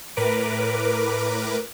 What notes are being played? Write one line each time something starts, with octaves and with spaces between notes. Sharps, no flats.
A2 A#4 B4 D6